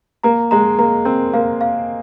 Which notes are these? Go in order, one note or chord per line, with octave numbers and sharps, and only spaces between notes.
A#3 A#5
G#3 A#5
A#3 A#5
C4 A#4
A#3 F5
F5